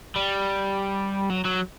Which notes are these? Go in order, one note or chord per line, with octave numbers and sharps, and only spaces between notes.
G3
F#3
F#3